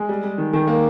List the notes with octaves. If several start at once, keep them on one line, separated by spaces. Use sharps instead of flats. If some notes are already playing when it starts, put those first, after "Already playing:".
Already playing: G#3
G3
G3
D#3
D#3
A#3